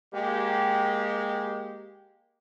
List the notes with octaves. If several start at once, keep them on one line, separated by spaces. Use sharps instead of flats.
G#3 A#3 G4